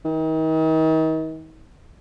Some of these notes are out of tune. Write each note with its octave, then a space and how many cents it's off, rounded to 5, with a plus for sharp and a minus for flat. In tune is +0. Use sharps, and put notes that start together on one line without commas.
D#3 +40